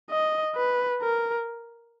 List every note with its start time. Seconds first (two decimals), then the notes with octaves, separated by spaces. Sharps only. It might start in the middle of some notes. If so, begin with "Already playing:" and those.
0.10 D#5
0.55 B4
1.02 A#4